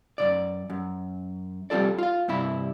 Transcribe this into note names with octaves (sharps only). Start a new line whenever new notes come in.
F#2 B2 D5
F#2
G3 C4 F4 A4 D5
F4 F5
G2 C3 E4 B5